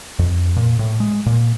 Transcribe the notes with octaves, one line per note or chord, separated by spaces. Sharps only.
F2
A#2
A2
G#3
A#2